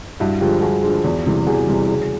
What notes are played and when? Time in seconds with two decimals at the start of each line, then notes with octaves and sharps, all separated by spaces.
0.20 G2 E4 F#4
0.40 D3 F3 G#3 F4 G4
0.62 G2 F#4 G#4
0.83 D3 F3 G#3
1.04 E2
1.26 C3 E3 G3
1.47 E2 F#4 G#4
1.67 C3 E3 G3
1.89 C#3